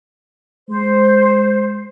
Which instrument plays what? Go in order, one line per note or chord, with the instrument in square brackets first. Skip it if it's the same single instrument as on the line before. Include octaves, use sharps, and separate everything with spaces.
[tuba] G#3 [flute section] C5